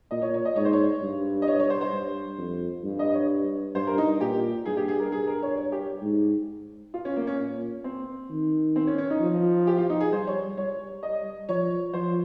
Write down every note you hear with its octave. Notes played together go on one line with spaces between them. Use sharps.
A#2 D#5
C#5
C#5
D#5
G#2 C#5
C5
C#5
G2
D#5
C#5
C#5
C5
C5
G2
F2
G2
D#5
C#5
G2 C5
A#4
D#4
A#2 G4
G2 G#4
G4
G#4
A#4
G2 G#4
A#4
C#5
C#5
G4
G#2
F4
C#4
A#3
C#4
A#2
C4
D#3
C4
C#4
C#4
D#4
F3
G4
F4
D#4
G#4
G3 C5
C#5
G3 C#5
D#5
F3 C#5
F3 C5